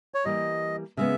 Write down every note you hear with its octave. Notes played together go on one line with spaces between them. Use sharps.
C#5
E3 G3 A#3 D#5
C#3 G#3 B3 E5